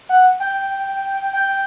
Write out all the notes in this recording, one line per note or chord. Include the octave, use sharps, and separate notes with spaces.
F#5
G5
G5